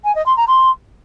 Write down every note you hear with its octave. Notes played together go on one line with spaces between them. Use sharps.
G#5
D#5
C6
A#5
C6